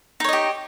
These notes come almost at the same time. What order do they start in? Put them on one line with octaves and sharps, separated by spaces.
D#4 C#5 D#5 G4